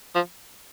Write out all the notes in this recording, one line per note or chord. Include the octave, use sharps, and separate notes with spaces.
F3